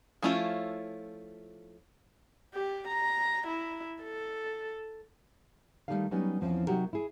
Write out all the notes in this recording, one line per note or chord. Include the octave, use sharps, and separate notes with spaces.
F3 A3 C#4 E4 F4
G4
A#5
E4
A4
D#3 F#3 G3 A3 D#4 F5
F#3 G3 B3 C#4 D#4
E2 F3 C4 C#4
C3 F#3 D#4 F#4 G4 A#4
E4 G#4